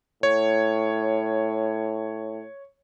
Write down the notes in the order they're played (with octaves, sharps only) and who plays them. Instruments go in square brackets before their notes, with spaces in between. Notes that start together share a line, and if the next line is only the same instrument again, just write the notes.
[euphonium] A2 [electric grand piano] C#5